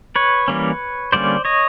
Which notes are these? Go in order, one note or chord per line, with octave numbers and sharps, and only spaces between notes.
B4 C#5
E3 G3 A#3 C#4
D3 G3 A#3 C#4 C5 D5
C#5 D#5